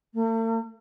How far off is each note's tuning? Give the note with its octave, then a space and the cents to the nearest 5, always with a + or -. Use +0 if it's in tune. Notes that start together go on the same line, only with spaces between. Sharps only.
A3 +45